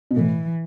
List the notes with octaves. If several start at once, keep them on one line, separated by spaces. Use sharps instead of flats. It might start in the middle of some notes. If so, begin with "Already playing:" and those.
B2
A2 E3